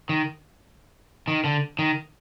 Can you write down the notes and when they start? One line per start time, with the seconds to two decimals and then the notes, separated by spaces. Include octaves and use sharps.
0.09 D#3
1.28 D#3
1.44 D3
1.79 D#3